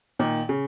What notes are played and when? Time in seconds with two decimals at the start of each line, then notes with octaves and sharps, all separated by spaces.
0.19 A#2 D#3
0.49 C#3